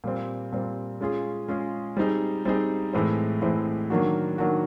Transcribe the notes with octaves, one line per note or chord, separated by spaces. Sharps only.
A#2 G3 C4
A#2 G3 C4
G#3 C#4 F4 G#4
G#3 C#4 F4 G#4
G3 C4 D#4 G#4
G3 C4 D#4 G#4
A2 E3 G#3 C4
A2 E3 G#3 C4
D#3 F#3 A#3 D4 F#4
D#3 F#3 A#3 D4 F#4